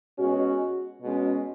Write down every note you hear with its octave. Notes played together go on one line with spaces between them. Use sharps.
B2 G#3 C#4 F#4
B2 G#3 C#4